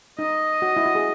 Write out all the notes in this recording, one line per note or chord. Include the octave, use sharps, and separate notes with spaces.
D#4 D#5
F#4
E4
F#4
G#4